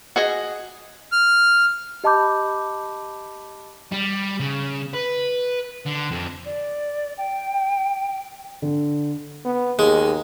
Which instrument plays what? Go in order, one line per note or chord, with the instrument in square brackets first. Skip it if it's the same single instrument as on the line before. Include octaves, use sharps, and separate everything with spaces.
[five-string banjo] F#4 G#4 D#5
[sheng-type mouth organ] F6
[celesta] G4 D#5 A5 B5 D6 G6
[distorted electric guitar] G3
C#3
B4
D3
F2
[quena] D5
G5
[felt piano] D3
[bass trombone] B3
[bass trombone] D#2 [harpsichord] G#3